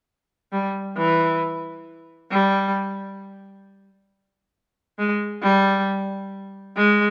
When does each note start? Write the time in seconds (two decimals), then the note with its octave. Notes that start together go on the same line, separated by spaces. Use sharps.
0.52 G3
0.96 E3
2.31 G3
4.99 G#3
5.43 G3
6.77 G#3